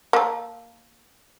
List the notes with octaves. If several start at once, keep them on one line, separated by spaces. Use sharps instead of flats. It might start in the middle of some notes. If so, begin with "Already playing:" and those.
A#3 A4